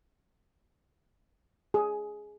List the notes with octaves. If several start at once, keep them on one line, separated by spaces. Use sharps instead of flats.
G#4